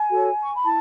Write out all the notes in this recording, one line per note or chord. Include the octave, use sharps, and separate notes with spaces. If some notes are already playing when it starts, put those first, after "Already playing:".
Already playing: G#5
F#4 A4 C#5
C#6
B5
E4 A5